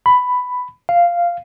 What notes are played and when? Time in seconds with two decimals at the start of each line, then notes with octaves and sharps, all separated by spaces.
0.06 B5
0.89 F5